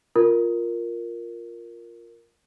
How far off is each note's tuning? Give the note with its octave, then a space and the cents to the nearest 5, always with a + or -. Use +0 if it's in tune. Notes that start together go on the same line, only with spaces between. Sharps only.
F4 +0 A#4 +0